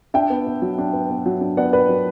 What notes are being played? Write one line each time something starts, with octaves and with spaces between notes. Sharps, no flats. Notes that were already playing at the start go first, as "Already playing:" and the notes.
D4 E5 G5
B3
B2
F#3
D4
B3
B2
F#3
D4
B3 D5 F#5
B2 B4 D5
F#3